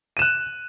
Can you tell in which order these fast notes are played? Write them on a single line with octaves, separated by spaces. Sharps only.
D#7 E7 F#6